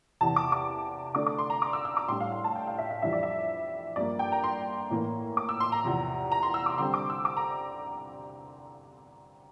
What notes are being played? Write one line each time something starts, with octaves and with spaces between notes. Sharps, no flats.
E2 C3 E3 A5
D6
D6
D3 A3 D4 D6
D6
C6
A#5
D6
E6
E6
D6
A2 G3 D4 C6
F5
F5
A5
G5
F5
E5
E5
F2 E3 G3 D4 E5
D5
E5
G2 F3 A#3 D5
G5
A#5
C6
A2 E3 A#3
D6
E6
C6
A#5
E2 C3 F3
A#5
C6
E6
D6
D3 G3 C4 C6
D6
E6
D6
A#5